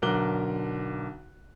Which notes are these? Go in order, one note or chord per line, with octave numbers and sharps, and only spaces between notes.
B1 D3 A#4 D6 F#6 G7